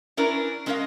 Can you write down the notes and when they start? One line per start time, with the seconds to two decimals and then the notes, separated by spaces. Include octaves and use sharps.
0.17 C#4 D4 E4 A#4 B4 D5
0.66 G#3 C#4 A#4 C5 D#5 F5